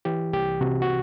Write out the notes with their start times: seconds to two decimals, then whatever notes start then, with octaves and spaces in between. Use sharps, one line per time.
0.05 E3 G4
0.33 C2 G4
0.61 C3 F#4
0.82 F#4